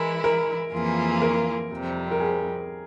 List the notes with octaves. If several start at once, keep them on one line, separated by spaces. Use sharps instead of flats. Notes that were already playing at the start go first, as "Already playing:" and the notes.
Already playing: E3 G#3 E4 A#4
A#4
F2 E3 A#3 F4 G#4
A#4
F2 C3 G3
A#4
G#4